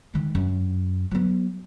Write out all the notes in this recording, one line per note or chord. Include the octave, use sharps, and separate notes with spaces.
D#3 G#3
F#2
F#3 B3